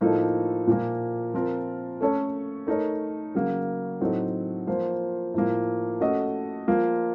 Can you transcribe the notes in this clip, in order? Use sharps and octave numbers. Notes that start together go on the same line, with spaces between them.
A2 F3 A#3 D#4 A4
A#2 F3 A#3
F3 C4 F4 A#4
A3 C#4 A4 C#5
A3 D#4 A#4 C#5
C#3 F#3 A#3
A2 F#3 C4 D#4 A4
F3 A#3 F4 C5
A2 F3 A#3
A3 C#4 F#4 A4 D#5
F3 A#3 F4